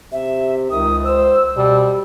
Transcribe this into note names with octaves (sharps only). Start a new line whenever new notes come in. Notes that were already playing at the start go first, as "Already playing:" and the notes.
C3 E5
C#2 D#3 D#6
C5 E6
B2 G3